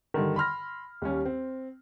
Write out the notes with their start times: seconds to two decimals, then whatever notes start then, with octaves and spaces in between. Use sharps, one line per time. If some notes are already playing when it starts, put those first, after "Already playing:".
0.14 G2 D3 D#3
0.36 B5 C6 F6 A#6
1.02 D#2 G3 C#4
1.25 C4